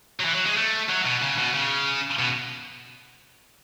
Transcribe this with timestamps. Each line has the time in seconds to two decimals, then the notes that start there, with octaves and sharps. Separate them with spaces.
0.20 F#3
0.25 E3
0.35 F#3
0.46 G#3
0.58 A3
0.89 F#3
1.06 B2
1.22 C#3
1.38 B2
1.54 C#3
2.19 B2